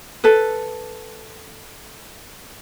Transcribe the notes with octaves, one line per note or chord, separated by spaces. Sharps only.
A4 B4